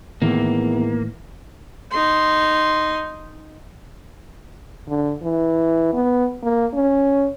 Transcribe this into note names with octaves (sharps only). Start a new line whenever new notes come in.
E2 A2 D#3 E3 A#3
D#4 C6
D3
E3
B3
A#3
C#4